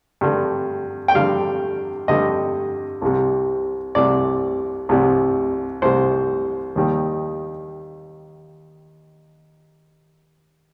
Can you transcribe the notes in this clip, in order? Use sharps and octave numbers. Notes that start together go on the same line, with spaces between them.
G2 D3 G3
G5
G2 D3 G3 F5
G2 D3 G3 D#5
C2 C3 G3
C2 C3 G3 D5
C2 C3 G3
C2 C3 G3 C5
D#2 D#3 G3